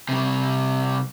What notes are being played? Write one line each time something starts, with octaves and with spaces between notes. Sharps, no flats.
C3 G3